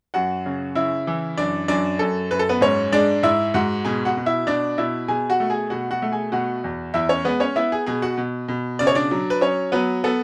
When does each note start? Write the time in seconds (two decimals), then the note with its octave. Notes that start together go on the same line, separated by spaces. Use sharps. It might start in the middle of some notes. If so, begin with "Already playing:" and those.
0.14 F#2 F#4 F#5
0.46 C#3
0.75 C#3 E4 E5
1.07 E3
1.38 F#2 D4 D5
1.68 F#2 D4 D5
1.99 F#2 A4
2.31 F#2 B4
2.39 A4
2.49 B3 B4
2.61 G#2 C#4 C#5
2.92 G#3 D4 D5
3.23 G#2 E4 E5
3.54 G#2 F#4 F#5
3.85 B2 G#4 G#5
4.05 F#4 F#5
4.17 B2
4.26 E4 E5
4.46 B2 D4 D5
4.78 B2 E4 E5
5.08 B2 G#4 G#5
5.30 F#4 F#5
5.40 A3
5.50 G#4 G#5
5.70 B2 F#4 F#5
5.91 F#4 F#5
6.02 A3
6.12 G#4 G#5
6.32 B2 F#4 F#5
6.64 E2
6.94 E2 E4 E5
7.09 C#4 C#5
7.25 G#3 B3 B4
7.40 C#4 C#5
7.56 B3 E4 E5
7.72 G#4 G#5
7.86 B2 G#4 G#5
8.02 F#4 F#5
8.18 B2
8.48 B2
8.79 C#3 D5
8.87 C#5
8.95 D4 D5
9.11 F#3
9.30 B4
9.41 F#3 C#4 C#5
9.72 F#3 B3 B4
10.04 B3 A4